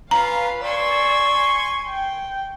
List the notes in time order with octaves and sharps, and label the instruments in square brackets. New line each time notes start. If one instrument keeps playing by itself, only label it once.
[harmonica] C#4 F4 [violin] B4 F5 [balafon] A#5
[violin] D5 E6 [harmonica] G#5 C6 C#6
[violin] G5